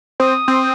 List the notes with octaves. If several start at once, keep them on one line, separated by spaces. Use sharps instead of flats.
C4 D#6
C4